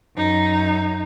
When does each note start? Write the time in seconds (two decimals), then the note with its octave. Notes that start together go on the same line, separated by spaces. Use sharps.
0.16 F#2 D#4